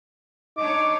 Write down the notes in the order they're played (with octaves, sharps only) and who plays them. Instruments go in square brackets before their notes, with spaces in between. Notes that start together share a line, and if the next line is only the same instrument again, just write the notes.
[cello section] D4 C#5 [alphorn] D#4 [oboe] D6